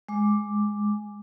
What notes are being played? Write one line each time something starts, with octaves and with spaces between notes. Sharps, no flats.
G#3 D6